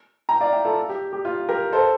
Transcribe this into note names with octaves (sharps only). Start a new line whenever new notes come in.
G5 A#5
D5 F5
E5 G5
F4 A4
G4
G4
F4
G4 A#4
A4 C5